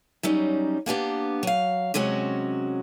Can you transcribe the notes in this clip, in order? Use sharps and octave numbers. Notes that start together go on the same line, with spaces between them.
F#3 G3 C#4 D#4
A#3 B3 D4 G4
F#3 F5
C3 F#3 G#3 C#4 F#4